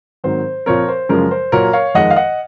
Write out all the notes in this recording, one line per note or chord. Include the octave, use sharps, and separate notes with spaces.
G#2 D#3 F#3 C4 C5
A#2 F3 C4 A#4 C#5
C5
F#2 C#3 F3 G#3 A#4
C5
A#2 F#3 A#3 A#4 C#5
C#5 F5
F2 D#3 G#3 D#5 F#5
F5
D#5 F#5